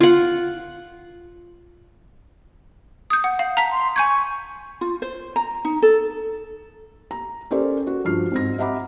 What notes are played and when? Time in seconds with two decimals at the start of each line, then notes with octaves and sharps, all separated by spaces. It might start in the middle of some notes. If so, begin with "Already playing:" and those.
0.01 F4 F#5
3.10 D#6 G6
3.24 F#5
3.39 F5
3.57 A5 A#5 B6
3.71 C6
3.96 G#5 C#6 G6 G#6
4.81 F4
5.02 C5
5.36 A#5
5.65 D#4
5.82 A4
7.11 A#5
7.51 C#4 G4 A4 A#4 C5 D5
7.87 F#4
8.05 G2 F3 F#4 F6 C7
8.32 G#2 C4 A#6
8.58 D#5 E5 F#5 A#5 B5 D6